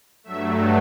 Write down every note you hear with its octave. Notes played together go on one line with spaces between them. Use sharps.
G2 F#3 A3 E5